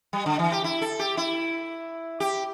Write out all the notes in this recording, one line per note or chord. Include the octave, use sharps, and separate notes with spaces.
G3
D3
E3
G4
E4
A4
G4
E4
G4